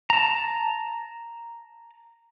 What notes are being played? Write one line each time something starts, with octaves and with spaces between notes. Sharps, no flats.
A5 A#5